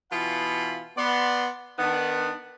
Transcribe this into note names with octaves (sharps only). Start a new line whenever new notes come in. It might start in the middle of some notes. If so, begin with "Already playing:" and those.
B2 E3 B3 F4 F5 B5
B3 D5 C6
D#3 B3 D4